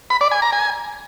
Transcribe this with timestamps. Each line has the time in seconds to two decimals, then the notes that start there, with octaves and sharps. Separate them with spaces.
0.10 B5
0.21 D5
0.31 G#5
0.42 A#5
0.53 G#5